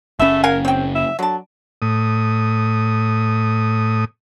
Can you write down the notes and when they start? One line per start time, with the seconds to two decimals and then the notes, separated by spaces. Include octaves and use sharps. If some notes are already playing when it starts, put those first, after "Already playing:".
0.19 F#1 A3 B3 C#4 E5
0.44 A#4 F5 F#5 G#5
0.65 C4 C#5 G5
0.95 E5
1.19 D3 F#3 A5
1.82 A2 D#6